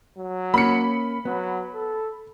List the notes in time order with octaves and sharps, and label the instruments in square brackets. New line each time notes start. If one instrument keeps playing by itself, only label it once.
[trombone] F#3
[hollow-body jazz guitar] A#3 C#4 [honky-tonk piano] B5 C#7
[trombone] F#3 [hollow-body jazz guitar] B3
[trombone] A4